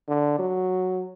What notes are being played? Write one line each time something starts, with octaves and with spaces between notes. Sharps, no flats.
D3
F#3